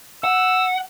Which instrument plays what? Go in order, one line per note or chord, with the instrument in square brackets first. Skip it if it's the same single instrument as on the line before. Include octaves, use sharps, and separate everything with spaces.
[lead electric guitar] F#5 [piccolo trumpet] E6